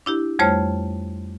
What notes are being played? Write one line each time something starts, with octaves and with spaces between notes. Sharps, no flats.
D4 E4 G4
F2 G3 A3 C5 C#5 F6